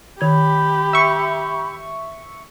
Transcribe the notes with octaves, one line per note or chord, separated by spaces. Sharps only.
D#3 G4 B5 G#6
E5 C#6